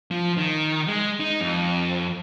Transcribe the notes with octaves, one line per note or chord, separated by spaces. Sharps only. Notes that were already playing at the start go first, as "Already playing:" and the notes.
F3
D#3
G#3
D#4
F2